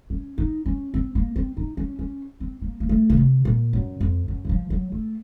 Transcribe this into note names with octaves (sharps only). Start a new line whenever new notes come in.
C#4
D#4
C#4
C4
A#3
C4
D#4
C#4
C#4
C4
A#3
A#3
A3
C#3
C3
A#2
F#2
F2
F#2
D#3
F3
F#3
A3